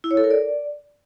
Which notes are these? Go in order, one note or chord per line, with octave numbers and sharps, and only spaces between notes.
E4
C#5
A4
A#4
D5